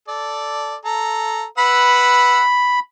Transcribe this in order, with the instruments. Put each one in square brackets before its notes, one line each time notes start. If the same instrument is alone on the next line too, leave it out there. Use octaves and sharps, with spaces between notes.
[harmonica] A4 D5
A4 A#5
[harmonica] B4 F#5 E6 [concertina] B5